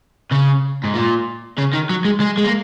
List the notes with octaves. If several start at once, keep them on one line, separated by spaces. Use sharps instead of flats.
C#3
G#2
A#2
C#3
D#3
F#3
G#3
G#3
G#3
A#3